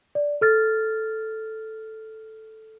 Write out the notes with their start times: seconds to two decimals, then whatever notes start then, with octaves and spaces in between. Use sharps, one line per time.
0.15 D5
0.41 A4 F6 A6